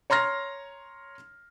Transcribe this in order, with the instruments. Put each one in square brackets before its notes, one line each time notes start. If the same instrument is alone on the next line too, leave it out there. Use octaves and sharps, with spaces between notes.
[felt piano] C#5 A#5 C6 F6 A#6